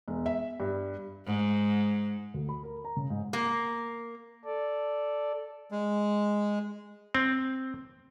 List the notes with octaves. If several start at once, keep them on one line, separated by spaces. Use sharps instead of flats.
E1
E5
G2
G#2
D2
B5
A#4
A#5
C#3
G#2
A#3
A4 D5
G#3
C4